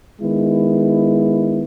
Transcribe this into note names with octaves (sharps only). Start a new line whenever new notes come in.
D#3 G#3 B3 E4